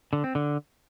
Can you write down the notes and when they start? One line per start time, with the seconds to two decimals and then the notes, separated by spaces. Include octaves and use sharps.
0.13 D3
0.24 C4
0.35 D3